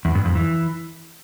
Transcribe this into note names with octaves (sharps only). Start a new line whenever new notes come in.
E2
G2
F2
E3